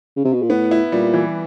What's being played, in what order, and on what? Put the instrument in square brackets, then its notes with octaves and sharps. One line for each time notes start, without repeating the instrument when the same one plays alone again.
[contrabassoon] C#3
C3
B2
A#2
[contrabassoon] A2 [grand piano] B3
[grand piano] E4
[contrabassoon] A#2 [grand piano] G3
[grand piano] E3